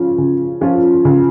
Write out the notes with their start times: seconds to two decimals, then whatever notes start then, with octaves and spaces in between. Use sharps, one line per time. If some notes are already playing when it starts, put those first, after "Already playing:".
Already playing: C#3 F3 C#4 F4
0.18 C#3
0.61 F3 C#4 F4
1.05 C#3